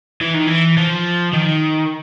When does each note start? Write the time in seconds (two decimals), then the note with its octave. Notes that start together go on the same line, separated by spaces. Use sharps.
0.21 E3
0.34 D#3
0.47 E3
0.77 F3
1.33 D#3